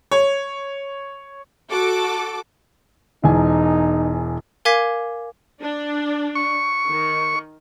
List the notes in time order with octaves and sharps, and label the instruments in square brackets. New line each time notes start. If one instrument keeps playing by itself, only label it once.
[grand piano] C#5
[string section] F#4 A4 D6
[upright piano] E1 E2 G#5 [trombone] D#4
[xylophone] A#4 F5 G#5 D6 G#6 B6
[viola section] D4
[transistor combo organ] C#6
[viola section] D#3